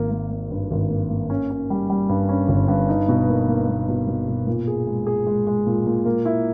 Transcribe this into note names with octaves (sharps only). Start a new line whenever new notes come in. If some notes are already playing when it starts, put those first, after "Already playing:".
Already playing: G#1 A#3
A#3
A#3
G2
G#1
A#3
A#3
C#4
C#4
G3
G3
G2
C#4
G1
G2
D#4
B2
A#3
A#3
A#3
B2
B2
B2
A#2
G#4
G#3
G#4
G#3
G#3
A#2
A#2
A#3
E4